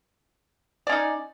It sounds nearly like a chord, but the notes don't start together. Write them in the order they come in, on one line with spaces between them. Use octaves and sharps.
D5 C#4 D#4